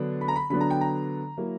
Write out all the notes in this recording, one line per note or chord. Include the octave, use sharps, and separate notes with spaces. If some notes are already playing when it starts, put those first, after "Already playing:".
Already playing: D3 F#3 B3 D4
B5
A#5
B5
D3 F#3 B3 D4 B5
A#5
G5
A#5
F#3 A#3 E4